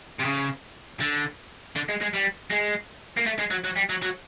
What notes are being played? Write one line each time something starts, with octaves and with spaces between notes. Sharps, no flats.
C3
C#3
D3
D3
G#3
G#3
G3
G#3
A#3
A3
G#3
F#3
F#3
G3
F#3
F#3